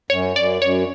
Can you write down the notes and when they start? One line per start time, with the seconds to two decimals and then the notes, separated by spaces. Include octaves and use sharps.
0.10 F#2 C#5
0.36 F#2 D5
0.62 F#2 C#5